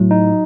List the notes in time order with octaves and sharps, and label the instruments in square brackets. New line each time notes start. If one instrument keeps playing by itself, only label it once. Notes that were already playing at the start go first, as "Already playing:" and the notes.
Already playing: [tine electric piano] A2 [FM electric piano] F#3
[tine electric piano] D#4